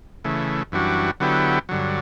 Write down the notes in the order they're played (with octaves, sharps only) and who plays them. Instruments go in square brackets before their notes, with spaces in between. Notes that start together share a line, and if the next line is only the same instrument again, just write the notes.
[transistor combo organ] C#3 E3 A3
F#2 E3 G3 D4 F#4
D3 F#3 B3 E4 G4
G2 D3 F#3